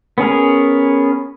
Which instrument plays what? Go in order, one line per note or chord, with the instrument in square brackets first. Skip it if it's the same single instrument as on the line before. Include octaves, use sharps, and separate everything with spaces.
[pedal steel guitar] B3 C#4 G#4 A#4